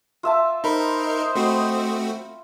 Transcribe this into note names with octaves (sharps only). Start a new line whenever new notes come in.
F4 E5 A5
D#4 A#4 C5 D#5 B5
A3 C4 F#4